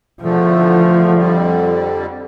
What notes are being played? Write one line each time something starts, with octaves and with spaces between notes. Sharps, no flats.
E2 D3 F3 A3
F2 D3 G3